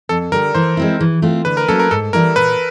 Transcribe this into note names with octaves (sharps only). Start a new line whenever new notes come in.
F2 A4
D3 G3 A#4
E3 C5
G#3 C4 E4
E3
A3 C4 F4
D3 B4
A#4
F#3 A#3 C#4 A4
A#4
G#2 A4
E3 G3 B3 E4 A#4
A#2 B4